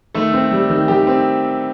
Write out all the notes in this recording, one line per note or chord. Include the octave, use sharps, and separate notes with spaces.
D#3 A3 A4
C4
G3
D#3
D#3 G4
C4